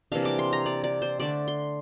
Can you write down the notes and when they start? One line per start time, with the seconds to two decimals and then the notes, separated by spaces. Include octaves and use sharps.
0.12 C3 E3 A#3 D4 F5
0.25 D6
0.39 C6
0.53 A#5
0.66 D5
0.84 D5
1.02 C5
1.20 D3 A3 D4 D5
1.48 C6